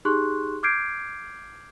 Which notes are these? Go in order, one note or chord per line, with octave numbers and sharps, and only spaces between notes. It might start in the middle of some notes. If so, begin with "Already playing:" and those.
D#4 G4 G#4 C6 C#6 F#6
D6 F6 G6 G#6 C7 D7